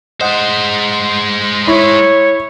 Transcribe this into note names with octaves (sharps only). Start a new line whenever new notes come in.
G#3 C5 D#5 F#5
E4 C#5 B5